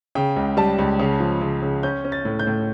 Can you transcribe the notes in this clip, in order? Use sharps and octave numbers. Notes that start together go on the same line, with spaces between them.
C#3 G5
C#2
G3 A5
C#2
C#3
F3
C#3
C#3
C#4 G6
C#4
A6
A2
G6
A2